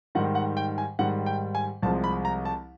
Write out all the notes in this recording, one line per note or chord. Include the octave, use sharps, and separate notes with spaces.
G#2 D#3 G3 F#5
F#5
G5
G#5
G#2 D#3 G3 F#5
G5
G#5
C2 C3 F3 G#3 A5
B5
A#5
A5